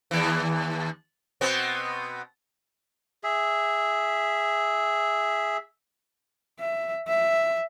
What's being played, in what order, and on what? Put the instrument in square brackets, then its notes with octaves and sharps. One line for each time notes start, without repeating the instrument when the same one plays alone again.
[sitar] D#2 E3
B2 B3 C4
[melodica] G#4 E5
[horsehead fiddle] E5
E5